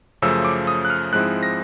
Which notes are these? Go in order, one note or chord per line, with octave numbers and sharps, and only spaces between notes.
F#2 C#3 F3 A3 E6
D6
D#6
F#6
F6
G#2 F3 G#3 C4 E4 F#6
A#6